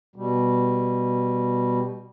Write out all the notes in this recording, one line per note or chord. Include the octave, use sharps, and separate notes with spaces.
B2 G3